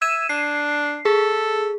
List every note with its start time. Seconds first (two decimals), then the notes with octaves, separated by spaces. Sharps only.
0.02 E5 G#6 D#7 E7
0.29 D4 C7
1.05 G#4 A4